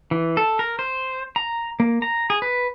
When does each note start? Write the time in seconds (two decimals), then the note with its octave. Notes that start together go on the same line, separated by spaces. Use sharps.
0.11 E3
0.37 A4
0.59 A#4
0.79 C5
1.36 A#5
1.80 A#3
2.02 A#5
2.30 G#4
2.42 B4